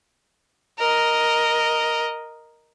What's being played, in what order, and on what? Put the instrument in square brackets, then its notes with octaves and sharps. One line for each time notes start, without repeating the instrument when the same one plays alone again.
[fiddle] A#4 D#5